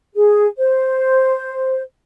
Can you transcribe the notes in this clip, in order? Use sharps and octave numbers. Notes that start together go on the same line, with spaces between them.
G#4
C5